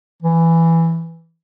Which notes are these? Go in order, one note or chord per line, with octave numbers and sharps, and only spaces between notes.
E3